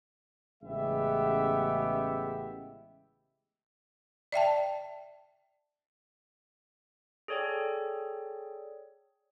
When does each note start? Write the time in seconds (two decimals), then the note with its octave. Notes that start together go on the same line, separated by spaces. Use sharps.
0.63 A1 C#3 G#3 B3 G4 E5
4.32 D5 E5 G5 A5
7.28 G#4 A4 C#5 D5 G5